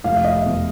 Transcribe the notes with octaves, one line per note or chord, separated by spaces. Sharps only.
F1 F5
E5
D#5
E5
E2 B2